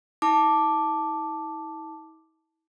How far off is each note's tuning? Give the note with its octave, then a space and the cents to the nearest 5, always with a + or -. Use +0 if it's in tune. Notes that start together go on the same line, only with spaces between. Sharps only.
E4 -40 A5 +0 D6 +0